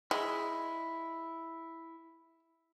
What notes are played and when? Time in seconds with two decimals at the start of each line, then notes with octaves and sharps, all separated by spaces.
0.11 G#3 E4